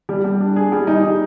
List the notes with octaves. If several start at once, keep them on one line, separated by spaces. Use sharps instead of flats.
G3
G3
D4
G#4
G3
D#4
G3